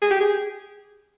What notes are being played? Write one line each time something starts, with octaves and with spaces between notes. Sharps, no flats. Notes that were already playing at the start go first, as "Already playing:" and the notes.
G#4
G4
G#4